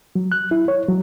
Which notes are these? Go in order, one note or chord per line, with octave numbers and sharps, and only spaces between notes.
F#3
F#6
E4
C#5
F#3